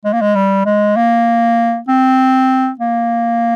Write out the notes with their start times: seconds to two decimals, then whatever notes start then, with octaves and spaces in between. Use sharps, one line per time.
0.05 G#3
0.13 A#3
0.21 G#3
0.35 G3
0.66 G#3
0.96 A#3
1.88 C4
2.79 A#3